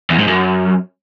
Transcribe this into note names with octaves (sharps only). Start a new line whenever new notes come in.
E2
G#2
F#2